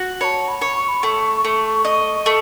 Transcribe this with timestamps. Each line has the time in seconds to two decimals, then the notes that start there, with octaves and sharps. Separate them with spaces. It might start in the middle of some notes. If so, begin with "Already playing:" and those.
Already playing: F#4
0.21 C#5 A5 B5
0.48 B5
0.61 C#5
0.76 C#6
0.88 B5
1.02 A3 C#6
1.44 A3
1.85 D#5 C#6
2.26 A3